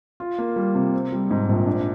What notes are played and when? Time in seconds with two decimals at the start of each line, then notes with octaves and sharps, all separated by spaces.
0.20 F4
0.38 A#3
0.56 G3
0.75 C3
0.94 C4
1.12 G3
1.31 G#2
1.49 A#1
1.67 D4